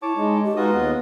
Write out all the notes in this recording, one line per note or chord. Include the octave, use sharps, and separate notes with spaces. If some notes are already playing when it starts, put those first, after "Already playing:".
E4 C#5 A5 D6
G#3 D#4
G4
G#3 D#4 F4 F#4 B4 D#5 D#6
D#2 B3